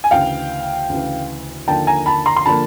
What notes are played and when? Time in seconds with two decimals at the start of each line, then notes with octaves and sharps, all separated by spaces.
0.04 G#5
0.11 D2 C#3 E3 F5 G5
0.89 D2 C#3 E3
1.68 D#2 D3 F3 A#3 G5 A5
1.87 G#5 A#5
2.06 A5 B5
2.26 A#5 C6
2.37 C6
2.46 D3 F3 A#3 A5 B5